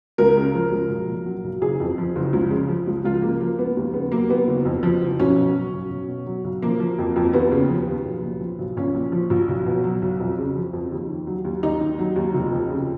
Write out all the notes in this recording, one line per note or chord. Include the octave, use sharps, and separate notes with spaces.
C#2 A#4
C#3
F3
C#2
B1
A#2
F#3
B1
F#1 G#4
F2
F3
F#1
C#2
C#3
F3
C#2
C#2 F4
C#3 A#3
F3 A#3
C#2 B3
D#2
C#3 B3
F#3 A#3
D#2 B3
F#1
F2
F3
F#1
B1 C#4
B2
F#3
B1
B1
B2
F#3
B1
F3 A#3
F3
F2
F2
D#2 B3
C#3
F3
D#2
B1
A#2
F3
B1
A#1 C#4
A#2
F3
A#1
B1
B2
F#3
B1
F2
C#3
F3
F2
D#2
D#3
F#3
D#2
D#2 D#4
D#3
F#3
D#2
F1
F2
C#3